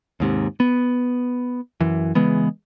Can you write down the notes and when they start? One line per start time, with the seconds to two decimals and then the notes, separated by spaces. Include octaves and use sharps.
0.20 D#2 G#2 C3
0.60 B3
1.81 F#2 E3
2.15 C#3 E3 G#3 B3